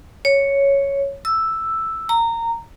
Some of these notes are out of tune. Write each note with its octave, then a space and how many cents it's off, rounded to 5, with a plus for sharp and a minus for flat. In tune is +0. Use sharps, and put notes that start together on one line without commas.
C#5 +0
E6 +0
A#5 -20